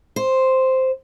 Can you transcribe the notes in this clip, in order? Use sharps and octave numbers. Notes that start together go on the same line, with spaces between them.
C5